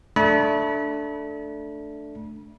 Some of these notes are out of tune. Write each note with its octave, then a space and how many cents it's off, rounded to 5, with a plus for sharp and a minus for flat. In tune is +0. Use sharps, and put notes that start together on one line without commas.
A3 +0 D4 +0 B5 -35